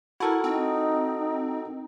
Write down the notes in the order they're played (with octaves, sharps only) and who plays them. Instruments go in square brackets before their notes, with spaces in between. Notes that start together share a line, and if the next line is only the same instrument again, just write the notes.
[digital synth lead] E4 [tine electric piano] F#4 A4 A#4
[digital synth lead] C4 [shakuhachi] D#4